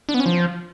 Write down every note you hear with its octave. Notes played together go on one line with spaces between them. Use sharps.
D4
B3
C#4
F3